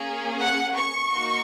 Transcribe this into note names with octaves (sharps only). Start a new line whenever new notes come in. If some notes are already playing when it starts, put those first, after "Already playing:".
Already playing: A#3 C#4 G#4
F#5
C#6
A#3 D#4 F#4